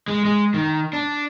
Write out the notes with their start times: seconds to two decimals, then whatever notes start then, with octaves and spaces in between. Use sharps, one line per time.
0.08 G#3
0.25 G#3
0.54 D#3
0.93 D4